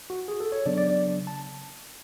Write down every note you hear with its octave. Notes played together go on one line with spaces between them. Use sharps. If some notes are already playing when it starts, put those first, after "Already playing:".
F#4
G#4
A4
C#5
C#3 F#3 B3 D4 D5
D5
D5
A5